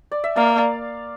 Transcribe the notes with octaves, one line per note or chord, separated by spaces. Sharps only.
D5
E5
A#3 D5 F5